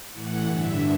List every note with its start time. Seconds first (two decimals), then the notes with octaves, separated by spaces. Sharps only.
0.12 A2 E3 F#5
0.45 G2 D3 E5